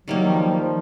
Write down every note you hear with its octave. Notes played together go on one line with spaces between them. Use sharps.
D#3 F#3 G3 A#3
F3
F3